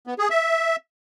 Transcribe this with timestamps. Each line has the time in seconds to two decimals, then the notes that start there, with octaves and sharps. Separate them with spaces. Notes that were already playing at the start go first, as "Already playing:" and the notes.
0.07 B3
0.19 G#4
0.30 E5